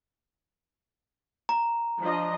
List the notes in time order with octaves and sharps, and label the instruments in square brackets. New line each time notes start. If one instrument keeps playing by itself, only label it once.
[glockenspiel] A#5
[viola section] F3 D4 D#5